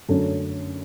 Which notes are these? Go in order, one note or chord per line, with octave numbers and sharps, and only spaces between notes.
F#2 D3 A3 C#4